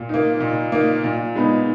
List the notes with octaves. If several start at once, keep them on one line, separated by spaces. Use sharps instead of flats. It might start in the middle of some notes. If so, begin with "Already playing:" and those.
Already playing: A#2
A#3 D#4
A#2
A#3 D#4
A#2
G#3 B3 D#4